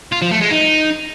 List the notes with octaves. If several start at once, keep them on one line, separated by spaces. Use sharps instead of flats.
F4
F3
A3
G#3
D#4